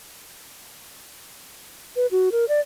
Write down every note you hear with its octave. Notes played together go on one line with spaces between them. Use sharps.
B4
F#4
A#4
D5